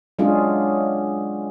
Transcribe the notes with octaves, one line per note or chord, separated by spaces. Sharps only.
F#3 G#3 C#4 D4 F4 G#4